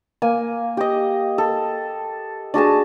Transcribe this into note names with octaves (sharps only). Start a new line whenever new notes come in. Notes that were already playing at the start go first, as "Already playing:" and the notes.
A#3 G#5
G4 D#5
A4
D4 F#4 G#4 A5